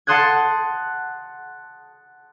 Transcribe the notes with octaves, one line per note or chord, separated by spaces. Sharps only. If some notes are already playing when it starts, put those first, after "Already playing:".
F#5 A5 C6 D#6 F#6 G#6